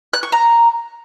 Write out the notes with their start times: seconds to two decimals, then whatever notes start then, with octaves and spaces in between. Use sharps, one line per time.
0.13 F#6
0.23 C#6
0.32 A#5